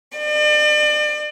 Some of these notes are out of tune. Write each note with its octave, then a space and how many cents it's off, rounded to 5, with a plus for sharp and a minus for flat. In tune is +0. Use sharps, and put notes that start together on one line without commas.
D5 +40